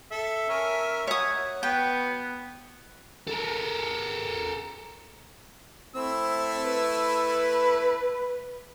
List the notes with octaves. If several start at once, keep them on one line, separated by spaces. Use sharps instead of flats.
A4 E5
C#4 A#4
F#4 C#5 D#6
B3 G5
A4 A#4
A3 C4 E4 E6
B4